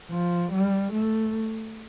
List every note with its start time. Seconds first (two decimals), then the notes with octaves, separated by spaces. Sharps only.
0.10 F3
0.52 G3
0.92 A3